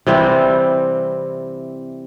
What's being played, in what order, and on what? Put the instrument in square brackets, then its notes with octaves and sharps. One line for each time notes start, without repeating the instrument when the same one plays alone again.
[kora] C3 E3 G3 C4